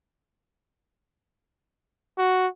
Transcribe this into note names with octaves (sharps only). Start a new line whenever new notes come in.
F#4